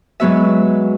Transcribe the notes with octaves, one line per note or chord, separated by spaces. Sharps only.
G#2 F#3 B3 F#4 E5